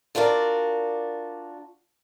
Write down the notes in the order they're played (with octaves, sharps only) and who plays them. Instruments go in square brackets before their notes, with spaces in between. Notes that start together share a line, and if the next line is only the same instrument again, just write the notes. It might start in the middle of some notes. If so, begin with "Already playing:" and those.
[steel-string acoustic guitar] D4 F4 F#4 A#4 D5